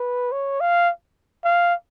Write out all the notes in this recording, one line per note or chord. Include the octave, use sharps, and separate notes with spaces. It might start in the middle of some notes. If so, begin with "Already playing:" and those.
Already playing: B4
C#5
F5
F5